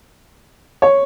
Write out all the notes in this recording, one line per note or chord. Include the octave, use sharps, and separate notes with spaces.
C#5